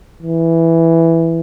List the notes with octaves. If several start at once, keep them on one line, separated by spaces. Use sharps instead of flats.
E3